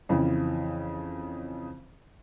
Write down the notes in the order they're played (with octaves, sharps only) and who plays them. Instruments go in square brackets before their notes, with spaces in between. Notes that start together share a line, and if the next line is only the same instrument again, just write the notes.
[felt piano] F2 C#3 E3